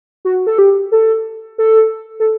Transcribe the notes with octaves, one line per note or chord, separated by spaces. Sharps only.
F#4
A4
G4
A4
A4
A4